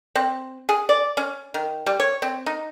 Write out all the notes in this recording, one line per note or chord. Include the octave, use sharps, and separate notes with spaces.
C4
G#4
D5
C#4
D#3
G3
C#5
C4
D#4